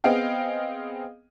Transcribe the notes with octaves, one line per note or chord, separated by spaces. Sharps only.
B3 C4 G#4 D#5 F5 G5